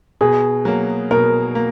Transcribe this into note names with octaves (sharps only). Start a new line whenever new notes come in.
B2 G#4
F#3 A#3
B2 A#4
A#3